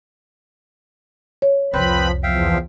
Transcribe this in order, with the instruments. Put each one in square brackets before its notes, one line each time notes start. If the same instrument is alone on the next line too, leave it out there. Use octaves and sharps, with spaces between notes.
[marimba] C#5
[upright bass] C2 F2 [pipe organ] F3 B5 [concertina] C4 B4 C5
[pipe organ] E2 F3 [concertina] E5 F5 G5